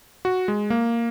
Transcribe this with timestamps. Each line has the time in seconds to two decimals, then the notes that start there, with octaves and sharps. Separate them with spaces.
0.25 F#4
0.48 G#3
0.70 A#3